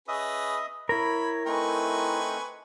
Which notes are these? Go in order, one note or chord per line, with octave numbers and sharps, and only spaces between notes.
C#4 G#4 B4 D#5 E5 D#6
E4 A#4 C#5 B5
A3 C4 D#4 B4 G#5 C#6